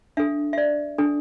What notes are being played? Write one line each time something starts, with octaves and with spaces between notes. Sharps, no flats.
D4 A4 E5
E5
D5
D4 A4